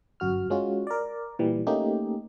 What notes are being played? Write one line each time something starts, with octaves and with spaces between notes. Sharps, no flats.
G1 F#2 F#4 F6
G#3 C#4 F4 F#4
A#4 D5
A#2 E3 G3
A3 A#3 C#4 D#4 G4